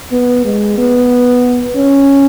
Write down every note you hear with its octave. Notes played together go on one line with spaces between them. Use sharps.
B3
G#3
B3
C#4